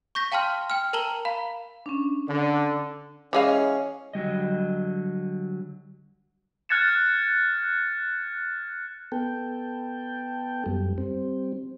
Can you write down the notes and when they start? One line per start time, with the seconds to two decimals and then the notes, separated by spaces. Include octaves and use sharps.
0.15 C#6 G6 A#6 B6
0.32 F5 G5 A5 C6 F6
0.70 G5 F6
0.93 A#4 A5 A#5 F#7 G7
1.25 F5 A#5 B5
1.86 C#4 D4
2.29 D3
3.33 E3 G#3 C#4 F5
4.13 D3 F#3 G3 D#5
6.69 F6 F#6 G#6 A6 C#7 E7
9.12 B3 A4 G5
10.66 F#2 G3
10.98 G3 C4